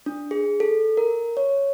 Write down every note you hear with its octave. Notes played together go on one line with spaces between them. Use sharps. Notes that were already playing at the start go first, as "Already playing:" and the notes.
D4
G#4
A4
A#4
C#5